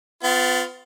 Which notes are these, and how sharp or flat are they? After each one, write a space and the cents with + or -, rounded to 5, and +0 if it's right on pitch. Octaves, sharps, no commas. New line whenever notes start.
B3 +40 F4 +5